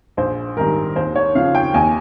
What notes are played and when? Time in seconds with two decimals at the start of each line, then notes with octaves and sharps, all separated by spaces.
0.17 A#1 C5
0.57 G#2 D#3 G3 A#4
0.96 D#2 C5
1.16 C#5
1.35 C#3 F3 F5
1.55 G5
1.74 D#2 G#5